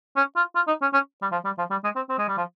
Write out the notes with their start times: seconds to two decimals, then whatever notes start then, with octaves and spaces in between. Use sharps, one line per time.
0.16 C#4
0.36 F4
0.55 F4
0.67 D#4
0.81 C#4
0.93 C#4
1.22 G3
1.32 F3
1.45 G3
1.58 F3
1.70 G3
1.84 G#3
1.96 C4
2.09 C4
2.18 G#3
2.28 G3
2.37 F3